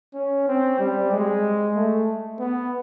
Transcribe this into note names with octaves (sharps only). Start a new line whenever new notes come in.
C#4
C4
G3
G#3
A3
B3